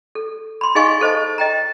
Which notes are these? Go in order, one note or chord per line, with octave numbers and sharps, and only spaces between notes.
A4
B5 C6
D#4 G#4 D#5 F5 G#5 C#6
A4 C5 D#5 A5
D#5 G5 A#5